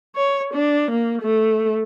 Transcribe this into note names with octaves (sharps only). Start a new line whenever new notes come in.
C#5
D4
A#3
A3